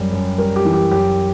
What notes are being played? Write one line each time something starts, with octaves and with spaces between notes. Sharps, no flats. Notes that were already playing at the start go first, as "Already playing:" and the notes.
Already playing: F#2 G3
F#2
G3 A#4
G4
E3
G4
F#2 G4